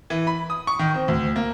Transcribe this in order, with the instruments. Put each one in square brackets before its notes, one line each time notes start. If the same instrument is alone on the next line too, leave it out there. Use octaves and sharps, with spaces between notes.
[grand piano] E3
B5
D#6
C#6
D#3
C4
D2
A#3